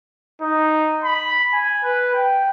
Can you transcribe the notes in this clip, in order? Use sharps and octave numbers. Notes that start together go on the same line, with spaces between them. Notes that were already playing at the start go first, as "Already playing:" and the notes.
D#4
B5
G#5
B4
G5